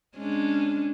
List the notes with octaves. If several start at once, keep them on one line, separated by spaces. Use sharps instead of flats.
G#3 C#4 D4